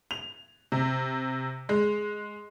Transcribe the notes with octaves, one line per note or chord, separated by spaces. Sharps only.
F7
C3
G#3